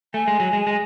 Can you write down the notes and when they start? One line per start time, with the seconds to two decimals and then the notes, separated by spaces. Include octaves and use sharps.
0.14 A3 G#5
0.28 G#3
0.40 F#3
0.53 G#3
0.67 G#3